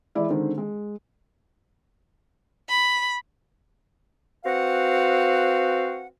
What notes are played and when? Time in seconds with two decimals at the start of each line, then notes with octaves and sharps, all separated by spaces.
0.15 E3 G#3 E4 D5
0.29 D3 D#3 G#3 C4
0.58 G#3
2.69 B5
4.45 C4 F#4 B4 F5 F#5